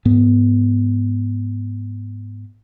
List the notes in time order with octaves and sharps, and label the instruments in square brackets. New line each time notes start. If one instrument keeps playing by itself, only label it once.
[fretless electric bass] G#2 B3